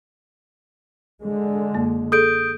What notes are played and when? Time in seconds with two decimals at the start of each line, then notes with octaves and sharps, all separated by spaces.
1.22 D3 G#3
1.74 F#2 A#3
2.12 G#4 A4 D#6 G6 D7